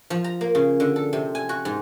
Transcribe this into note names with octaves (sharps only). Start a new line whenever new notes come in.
F3
A#5
A#3
C#3
D3
A4
C3
G#5
F#4
G#2